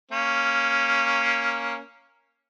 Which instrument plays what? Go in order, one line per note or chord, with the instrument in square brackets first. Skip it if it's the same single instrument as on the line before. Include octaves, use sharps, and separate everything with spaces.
[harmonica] A#3 C#4